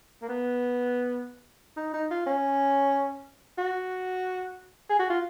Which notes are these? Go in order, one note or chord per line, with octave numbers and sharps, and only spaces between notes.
A#3
B3
D#4
D#4
F4
C#4
F#4
G#4
F#4
F4